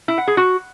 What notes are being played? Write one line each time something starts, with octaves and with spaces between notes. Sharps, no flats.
E4
F#5
G#4
F#4